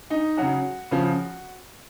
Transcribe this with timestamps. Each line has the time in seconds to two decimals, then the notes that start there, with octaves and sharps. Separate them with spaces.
0.10 D#4
0.37 C#3 F#3 F#4
0.91 C#3 F3